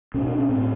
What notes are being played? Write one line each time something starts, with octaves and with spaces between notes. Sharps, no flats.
B2 C#4
D4
C#4
A2 C4